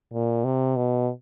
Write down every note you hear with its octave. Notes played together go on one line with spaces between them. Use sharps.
A#2
C3
B2